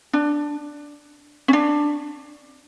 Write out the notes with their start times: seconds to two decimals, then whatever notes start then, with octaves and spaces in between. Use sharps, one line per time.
0.13 D4
1.48 C#4
1.53 D4